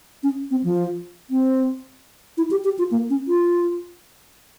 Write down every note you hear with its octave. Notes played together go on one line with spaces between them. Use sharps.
C#4
C4
F3
C4
E4
G4
G4
F4
A#3
C#4
F4